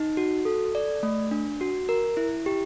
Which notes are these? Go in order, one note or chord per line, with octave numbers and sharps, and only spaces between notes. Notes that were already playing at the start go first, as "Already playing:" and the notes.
Already playing: D#4
F#4
A4
D5
A3
D4
F#4
A#4
E4
G4